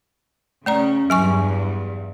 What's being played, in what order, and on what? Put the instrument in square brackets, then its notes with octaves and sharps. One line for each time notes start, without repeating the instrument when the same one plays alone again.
[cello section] C#3 C#4 [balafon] A3 D5 A#5
[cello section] E2 G2 [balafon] F#3 G#5 C#6